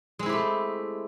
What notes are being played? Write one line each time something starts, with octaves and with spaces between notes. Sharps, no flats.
G#3 A3 C4 E4 G4